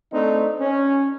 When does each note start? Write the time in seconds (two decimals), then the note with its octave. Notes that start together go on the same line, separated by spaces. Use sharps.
0.13 A3 C4 D4 D#4
0.60 C#4